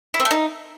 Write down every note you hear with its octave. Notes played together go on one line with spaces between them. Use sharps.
E4
C4
A3
D#4